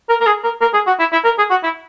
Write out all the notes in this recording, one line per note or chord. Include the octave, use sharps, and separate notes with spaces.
A#4
A#4
G#4
A#4
A#4
G#4
F#4
E4
E4
A#4
G#4
F#4
E4